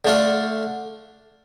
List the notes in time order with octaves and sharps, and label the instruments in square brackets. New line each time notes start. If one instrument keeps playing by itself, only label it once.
[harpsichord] D3 A3 D4 F4